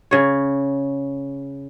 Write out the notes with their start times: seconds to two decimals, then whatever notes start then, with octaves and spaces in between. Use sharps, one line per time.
0.11 C#3 C#5